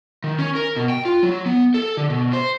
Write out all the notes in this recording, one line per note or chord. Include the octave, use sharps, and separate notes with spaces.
D#3
C#4
A#4
B2
G5
F4
F#3
B3
A4
D3
B2
C5